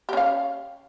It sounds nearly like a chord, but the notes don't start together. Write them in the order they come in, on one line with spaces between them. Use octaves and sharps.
G4 C#4 F5